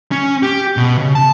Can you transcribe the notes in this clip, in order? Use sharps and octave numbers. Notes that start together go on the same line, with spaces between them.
C#4
G4
B2
C#3
A5